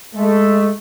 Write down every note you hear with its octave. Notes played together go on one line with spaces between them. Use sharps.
G#3 A3